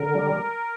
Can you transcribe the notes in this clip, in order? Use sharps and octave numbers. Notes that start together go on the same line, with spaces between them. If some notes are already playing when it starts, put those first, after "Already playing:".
Already playing: D3 A#4
G3